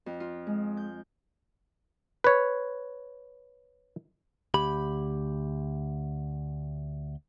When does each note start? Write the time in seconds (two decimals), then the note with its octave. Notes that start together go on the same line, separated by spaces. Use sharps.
0.06 F2
0.20 F4
0.47 G#3
0.77 G6
2.24 B4 C#5
4.54 D2 G4 B5